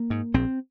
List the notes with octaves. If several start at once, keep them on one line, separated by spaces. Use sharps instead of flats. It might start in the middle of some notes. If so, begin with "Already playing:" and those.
Already playing: A#3
G#2
A#1 C4